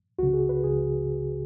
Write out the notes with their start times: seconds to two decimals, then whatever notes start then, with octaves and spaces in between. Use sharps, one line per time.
0.19 C#2 C#3 F#4
0.34 G#4
0.49 B4
0.64 C#2 C#3 G#4